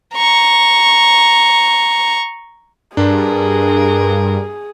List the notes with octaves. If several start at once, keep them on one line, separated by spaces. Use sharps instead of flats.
A#5 C#6
G2 D4 G#4 A#4